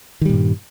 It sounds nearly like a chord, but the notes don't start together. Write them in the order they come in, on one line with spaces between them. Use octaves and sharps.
D#3 G3 A#2 G2